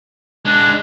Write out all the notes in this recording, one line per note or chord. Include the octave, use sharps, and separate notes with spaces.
G#3 D4 F#6